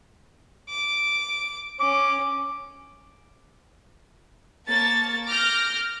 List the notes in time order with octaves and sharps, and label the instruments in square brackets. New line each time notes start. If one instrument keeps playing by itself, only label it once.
[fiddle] D6
[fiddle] C#4 [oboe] D6
[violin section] A#3 C#5 A5 A6
D6 F6 G6 A#6